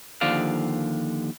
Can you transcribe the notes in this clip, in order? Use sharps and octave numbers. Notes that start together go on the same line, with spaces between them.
D#2 D3 F3 D5 F5